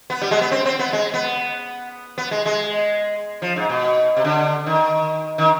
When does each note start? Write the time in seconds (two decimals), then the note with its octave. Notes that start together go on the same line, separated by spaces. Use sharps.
0.10 B3
0.22 G3
0.31 G#3
0.41 B3
0.51 C4
0.65 C4
0.79 B3
0.93 G#3
1.14 B3
2.18 B3
2.31 G#3
2.46 G#3
3.42 F3
3.56 G#2
3.69 B2
4.17 C3
4.24 D3
4.66 D#3
5.38 D#3